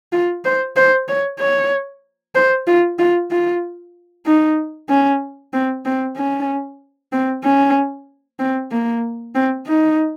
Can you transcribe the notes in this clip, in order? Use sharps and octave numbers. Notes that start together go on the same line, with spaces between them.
F4
C5
C5
C#5
C#5
C5
F4
F4
F4
D#4
C#4
C4
C4
C#4
C4
C#4
C4
A#3
C4
D#4